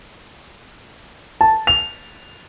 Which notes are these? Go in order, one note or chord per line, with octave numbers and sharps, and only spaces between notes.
A5
F7